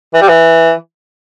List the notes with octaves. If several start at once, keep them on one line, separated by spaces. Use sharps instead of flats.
E3
G3
E3